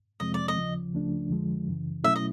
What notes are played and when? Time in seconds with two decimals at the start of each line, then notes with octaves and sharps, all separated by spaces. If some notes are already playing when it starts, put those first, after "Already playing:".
0.20 F2 C3 F3 G#3 C4 D#5
0.34 D5
0.48 D#5
0.56 D#2 C#3 F3
0.93 C#2 C#3 F3 A3 D4
1.30 F2 D3 F3 G#3
1.68 F#2 C#3 E3
2.04 B2 F#3 A3 C#4 E4 E5
2.16 D#5